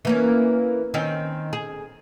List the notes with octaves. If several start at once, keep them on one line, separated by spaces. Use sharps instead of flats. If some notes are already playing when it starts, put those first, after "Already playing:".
E3 A#3 C#4
D#3 C4 C#4
G#4